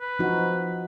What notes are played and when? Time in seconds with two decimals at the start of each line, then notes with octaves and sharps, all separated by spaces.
0.01 B4
0.19 F3 D#4 F#4